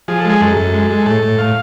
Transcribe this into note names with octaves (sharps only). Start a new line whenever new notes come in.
F3 G#4
A4
G#3 G#4
F#2 A4
F#2
G#3
G#3
A2 A4
A2
A2 F5